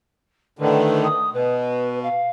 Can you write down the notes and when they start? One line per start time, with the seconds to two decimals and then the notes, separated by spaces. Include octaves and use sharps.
0.59 A2 D3 D#3 B4
1.03 D#6
1.33 B2 B4
2.02 F5